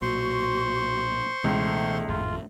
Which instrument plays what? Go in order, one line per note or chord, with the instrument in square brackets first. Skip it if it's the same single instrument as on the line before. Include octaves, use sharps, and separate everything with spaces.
[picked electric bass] B1 A#2 [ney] F#4 [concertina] C5 C6 C#6
[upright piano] C#2 [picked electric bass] B2 E3 [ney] A3
[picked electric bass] G#1 F2 A2 [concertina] F4